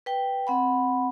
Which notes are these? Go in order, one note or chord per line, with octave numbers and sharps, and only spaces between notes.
B4 G5
C4 F#5 B5